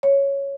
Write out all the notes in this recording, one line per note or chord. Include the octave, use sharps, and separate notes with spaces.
C#5